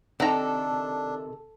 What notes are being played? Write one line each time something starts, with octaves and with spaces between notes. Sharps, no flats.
C3 D#3 D4 A4 A#5